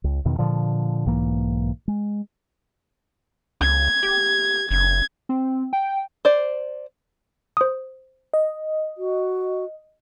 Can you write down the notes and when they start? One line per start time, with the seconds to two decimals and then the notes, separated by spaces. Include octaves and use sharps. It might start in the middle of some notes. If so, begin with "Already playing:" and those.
0.04 C#2
0.25 E2 B2 D#3
0.39 A#2 D3 F3
1.06 B1 G#2 E3 A#3
1.88 G#3
3.61 C#2 G#6
4.03 G4
4.71 F#1 G#6
5.29 C4
5.73 G5
6.25 C5 D5
7.57 C5 D#6
8.34 D#5
8.98 F#4